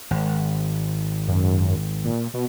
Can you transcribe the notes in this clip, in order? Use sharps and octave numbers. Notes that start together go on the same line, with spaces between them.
G#1
F#2
A#2
B2